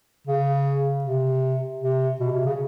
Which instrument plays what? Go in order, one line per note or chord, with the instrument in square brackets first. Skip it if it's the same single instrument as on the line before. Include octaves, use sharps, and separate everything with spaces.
[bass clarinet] C#3
C3
C3
B2
C3
C#3